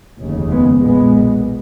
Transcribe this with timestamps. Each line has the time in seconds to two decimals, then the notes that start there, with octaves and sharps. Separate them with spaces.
0.20 F1 D#2 C#3
0.51 G#3 B3
0.81 B1 A#2 G#3 B3